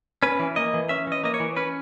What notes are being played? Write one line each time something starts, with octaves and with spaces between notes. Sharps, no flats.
C#4 B4
E3
A#3 D#5
E3
C#4 E5
E3 D#5
A#3 D#5
C#5
E3
C#4 B4